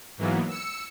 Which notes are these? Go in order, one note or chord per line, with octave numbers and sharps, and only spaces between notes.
G#2 E3 F#3 A#3 B3
E6 C#7